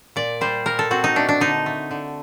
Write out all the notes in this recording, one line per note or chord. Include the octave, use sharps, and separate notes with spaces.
A#2 D5
G3 C5
A#2 A#4
A4
C4 F#4
D#4
A3 D4
D4
D3 D#4
A3
D3